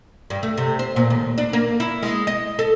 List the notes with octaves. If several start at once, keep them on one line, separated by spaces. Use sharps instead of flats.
G2
A3
C3
C5
A#2
D#2
D4
A#3
E4
G#3
D#5
A4